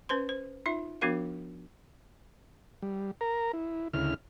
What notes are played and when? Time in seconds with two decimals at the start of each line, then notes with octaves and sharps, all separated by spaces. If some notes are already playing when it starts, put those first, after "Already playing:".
0.09 C#4 B4 C5 C6
0.29 C5
0.66 D#4 F4 E5
1.01 F3 B3 D4 F#4 A#4 F5
2.82 G3
3.21 A#4 A#5
3.53 E4
3.93 D2 C#3 E4 F6